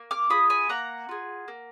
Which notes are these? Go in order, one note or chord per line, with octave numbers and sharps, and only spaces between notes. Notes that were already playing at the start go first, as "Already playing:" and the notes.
Already playing: A#3
D6 F6
F4 G#4 B5 D#6
G#5 B5
A#3 F#5 A#5
F4 G#4
A#3